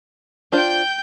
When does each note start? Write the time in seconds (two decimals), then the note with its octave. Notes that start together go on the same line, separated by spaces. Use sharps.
0.52 D4 F4 C5 G5 G6